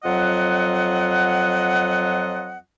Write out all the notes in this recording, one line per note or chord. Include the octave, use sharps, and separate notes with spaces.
F2 F#3 F4 D#5 F#5